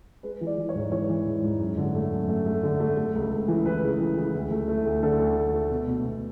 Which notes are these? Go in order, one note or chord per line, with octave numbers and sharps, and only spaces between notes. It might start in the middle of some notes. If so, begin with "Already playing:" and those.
G#3 B4
E3
D5
E3
C#5
G#2
E3 C#5
E3
G#2
G#2
F#2
D3
A3
F#2
A3
A3
D3
A3
A3
C#2
C#3
E3
E3 B4
C#3
E3
E3
D2
A3
A3
D2
D3 A4
D2
D2
A3
B2
B2
B2